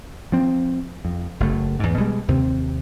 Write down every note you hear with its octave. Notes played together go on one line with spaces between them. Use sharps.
F3 C4
F2
F#1 A3
E2 G#2
B2 G3 G#3
D#2 C3 C4